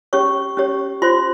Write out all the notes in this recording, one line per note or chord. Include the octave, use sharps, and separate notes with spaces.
C#4 G4 C#5 C#6
C#4 G4 C#5
F4 C5 C6